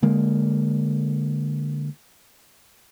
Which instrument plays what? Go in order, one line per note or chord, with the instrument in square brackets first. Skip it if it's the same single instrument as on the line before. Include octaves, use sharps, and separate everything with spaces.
[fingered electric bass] D3 G#3 A#3